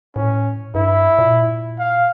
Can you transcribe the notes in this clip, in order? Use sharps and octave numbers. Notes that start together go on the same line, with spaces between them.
A2 C#4
G2 E4
A#2
F5